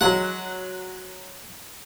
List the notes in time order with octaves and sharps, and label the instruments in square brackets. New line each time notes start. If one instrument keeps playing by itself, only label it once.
[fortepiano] F#3 G#3 [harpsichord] F#5